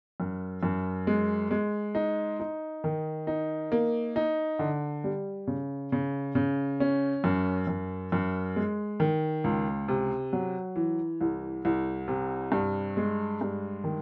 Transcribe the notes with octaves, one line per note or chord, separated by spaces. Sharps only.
F#2
F#2
G#3
G#3
D#4
D#4
D#3
D#4
A#3
D#4
D3
G3
C#3
C#3
C#3
C#4
F#2
F#2
F#2
G#3
D#3
C#2
C3
F#3
E3
C2
C2
C3
G2
G#3
G2
D#3